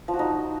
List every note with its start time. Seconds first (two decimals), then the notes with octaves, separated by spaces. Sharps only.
0.08 F3
0.14 F#4
0.19 D#4